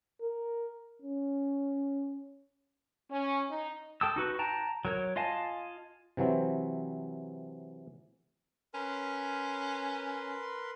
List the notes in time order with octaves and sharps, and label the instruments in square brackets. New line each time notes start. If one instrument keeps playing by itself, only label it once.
[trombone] A#4
C#4
[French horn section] C#4
D#4
[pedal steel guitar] A4 G5 A5 D#6 E6
D#4 F#4 B4 C#6
G5 A5 A#5
F#3 A#4 C#5
F4 D#5 F5 G#5 A5
[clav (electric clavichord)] C3 E3 F#3 C4
[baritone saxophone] C#4 [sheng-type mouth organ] A#4 B4 C6